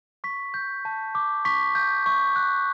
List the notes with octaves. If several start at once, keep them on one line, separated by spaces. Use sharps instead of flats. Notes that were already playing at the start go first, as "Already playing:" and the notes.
C#6 B6
G6
A5
D6
C#6 B6
G6
C#6
F#6